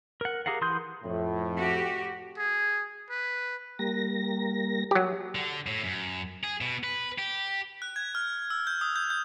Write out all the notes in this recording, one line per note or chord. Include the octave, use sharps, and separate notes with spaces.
A#4 F#5
G4 G#4 A#4 F5 F#5
E3 C6 D#6 F#6 G6
F2 A2
F#4 G4
G#4
B4
G3 A#3 A#6
F#3 G4
D3
A2
F#2
G#4
B2
B4
G4
F#6
G#6
F6
E6
G6
D#6
G6
G6